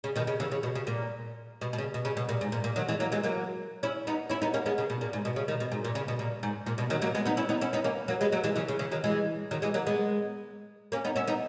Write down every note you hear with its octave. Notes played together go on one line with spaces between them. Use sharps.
C#3
B2 D#3
C#3
C#3 E3
C#3
B2
C#3
A#2
B2
B2
C#3
B2
C#3
B2
A#2
G#2
A#2
A#2
D#3 F#3
E3 G#3
F#3 A#3
E3 G#3
F#3 A#3
C#4 E4
B3 D#4
C#4 E4
B3 D#4
A#3 C#4
G#3 B3
C#3
B2
A#2
G#2
B2
C#3
B2 D#3
B2
G#2
A#2
C#3
B2
A#2
G#2
A#2
B2
D#3 F#3
F#3 A#3
G#3 B3
B3 D#4
C#4 E4
B3 D#4
C#4 E4
B3 D#4
A#3 C#4
F#3 A#3
G#3 B3
F#3 A#3
E3 G#3
C#3 E3
C#3
C#3 E3
D#3 F#3
E3 G#3
D#3 F#3
E3 G#3
F#3 A#3
G#3 B3
A#3 C#4
B3 D#4
C#4 E4
B3 D#4